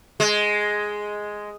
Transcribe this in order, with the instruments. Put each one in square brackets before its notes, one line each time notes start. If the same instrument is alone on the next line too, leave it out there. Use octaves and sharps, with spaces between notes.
[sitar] G#3